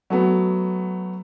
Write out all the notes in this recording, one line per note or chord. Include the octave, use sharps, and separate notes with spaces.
F#3 A3 B3